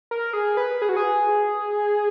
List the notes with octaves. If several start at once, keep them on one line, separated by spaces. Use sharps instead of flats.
A#4
G#4
B4
G#4
F#4
G#4